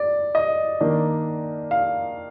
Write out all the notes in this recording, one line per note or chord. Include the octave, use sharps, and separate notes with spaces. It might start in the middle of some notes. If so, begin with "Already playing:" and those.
Already playing: D5
D#5
D#3 A#3 D4
F5